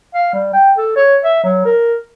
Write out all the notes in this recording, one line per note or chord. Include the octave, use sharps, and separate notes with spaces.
F5
G3
G5
A4
C#5
E5
F#3
A#4